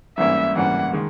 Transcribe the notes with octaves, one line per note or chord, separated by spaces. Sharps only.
G#2 E3 G3 A#3 C#4 E5
G#2 E3 G3 A#3 C#4 F#5
D#3 G#3